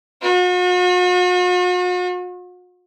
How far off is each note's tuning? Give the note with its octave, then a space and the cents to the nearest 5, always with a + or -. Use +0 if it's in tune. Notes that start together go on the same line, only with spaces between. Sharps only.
F#4 -45